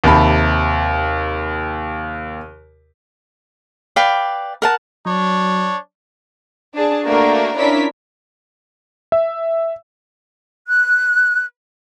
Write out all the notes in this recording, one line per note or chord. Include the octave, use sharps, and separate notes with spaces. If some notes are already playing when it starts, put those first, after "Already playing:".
D#2 C3 A5 B5
B4 D5 F5 G5
A#4 F#5 A5
F#3 D4 C#5
D4 G#4 A5
A3 A#3 D4 F#4 A#4
C#4 D4 E4 F4 A#4 B6
E5
F#6